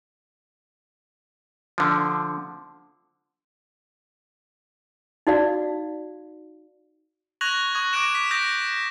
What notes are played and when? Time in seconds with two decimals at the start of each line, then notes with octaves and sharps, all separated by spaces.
1.78 D3 F3
5.27 D#4 F#4 D5 F5
7.41 C#6 F#6 G#6 A#6 F7 F#7
7.75 C#6 D#6 G#6
7.93 C#6 D6 F#6 A#6 D7 E7
8.15 B6
8.31 D#6 G6 A#6 B6 D7 E7